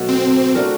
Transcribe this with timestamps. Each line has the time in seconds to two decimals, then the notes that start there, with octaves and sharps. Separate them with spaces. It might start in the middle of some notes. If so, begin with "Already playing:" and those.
Already playing: B2 F#3 A3
0.08 C4
0.55 A3 D4 F#4 A#4